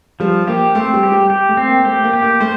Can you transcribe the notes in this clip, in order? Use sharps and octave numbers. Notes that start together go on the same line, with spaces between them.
F3 G3
A#3 G4
A3 C4
G3
G4
G3
G4
A3
C4
A#3
A3 G4
A#3
G4
A#3
A3 C5